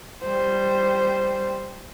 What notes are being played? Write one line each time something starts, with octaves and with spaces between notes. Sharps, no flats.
G3 C5